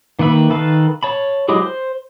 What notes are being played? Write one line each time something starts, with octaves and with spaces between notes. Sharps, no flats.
D#3 A#3 B4 E5 B5
D#3 A4 B4 F5
C#5 A5 B5
F#3 G#3 E4 G4 G#4
C5